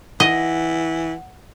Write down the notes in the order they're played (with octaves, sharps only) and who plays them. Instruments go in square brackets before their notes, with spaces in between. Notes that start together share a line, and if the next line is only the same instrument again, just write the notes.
[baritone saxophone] E3 [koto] D#5 [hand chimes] F#5